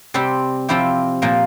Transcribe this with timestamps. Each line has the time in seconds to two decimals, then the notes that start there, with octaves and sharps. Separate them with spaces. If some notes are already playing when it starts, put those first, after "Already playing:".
0.14 C3 G3 C4 G4
0.69 C3 F3 C4 E4 G4
1.22 A#2 F3 A#3